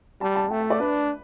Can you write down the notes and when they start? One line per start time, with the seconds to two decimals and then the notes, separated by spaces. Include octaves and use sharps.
0.21 G3 A5
0.36 A5
0.50 A3 G5
0.60 E5
0.70 D5
0.80 D4 B4